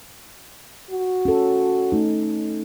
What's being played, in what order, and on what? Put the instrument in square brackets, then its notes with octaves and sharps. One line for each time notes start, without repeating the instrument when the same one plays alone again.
[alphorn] F#4
[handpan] C#4 A4
A3 D#4